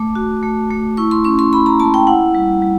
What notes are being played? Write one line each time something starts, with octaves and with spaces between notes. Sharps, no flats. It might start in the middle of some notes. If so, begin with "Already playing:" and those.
Already playing: A3 D6
F#4
A3
A3
E4 C#6
C6
C#4 C#6
C6
E4 B5
A#5
A#3 A5
G5
E4 F#5
G3
G3